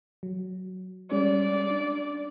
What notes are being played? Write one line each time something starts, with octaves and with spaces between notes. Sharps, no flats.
F#3
G3 G#3 C#4 D5
D4